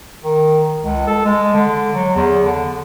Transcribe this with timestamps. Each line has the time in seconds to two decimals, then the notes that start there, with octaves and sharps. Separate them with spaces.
0.23 D#3
0.84 C#2
1.07 A4
1.25 G#3
1.54 D3
1.95 F#3
2.16 E2
2.44 D3